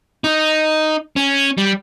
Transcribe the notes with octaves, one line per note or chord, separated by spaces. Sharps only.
D#4
C#4
G3